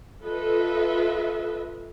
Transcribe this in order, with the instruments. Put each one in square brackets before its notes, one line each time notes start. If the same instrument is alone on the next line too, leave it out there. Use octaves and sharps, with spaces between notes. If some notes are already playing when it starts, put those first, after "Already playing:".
[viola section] F4 A4 B4 D#5 E5